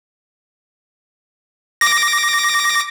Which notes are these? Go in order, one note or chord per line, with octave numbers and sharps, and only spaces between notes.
D6 A#6